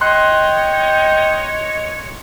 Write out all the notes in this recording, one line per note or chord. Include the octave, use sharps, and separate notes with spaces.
C#5 D#5 G5 C6 F#6